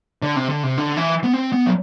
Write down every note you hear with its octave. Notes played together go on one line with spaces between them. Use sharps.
D3
C3
D3
C3
D3
E3
B3
C4
B3
F#3